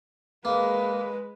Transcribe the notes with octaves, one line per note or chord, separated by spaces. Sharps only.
G#3 A#3 B4